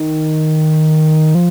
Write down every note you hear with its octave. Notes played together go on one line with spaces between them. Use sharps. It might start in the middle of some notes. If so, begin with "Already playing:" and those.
Already playing: D#3
F3